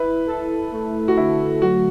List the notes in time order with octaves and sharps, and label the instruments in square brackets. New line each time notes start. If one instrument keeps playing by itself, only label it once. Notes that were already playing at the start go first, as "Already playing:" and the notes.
Already playing: [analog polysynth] E4 [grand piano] B4
[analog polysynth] A4
A3
[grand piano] F#4
[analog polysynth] D3 [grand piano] E4
[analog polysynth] F#3 [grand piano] F#4